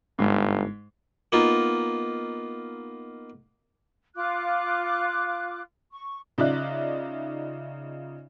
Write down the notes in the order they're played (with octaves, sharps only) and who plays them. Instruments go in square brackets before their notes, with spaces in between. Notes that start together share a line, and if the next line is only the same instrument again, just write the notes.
[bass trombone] G1 [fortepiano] G#2
[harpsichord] A#3 B3 D#4 F4
[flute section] F4 D6 F#6
C#6
[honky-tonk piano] C#3 D#4 F4 D5 E5 F#6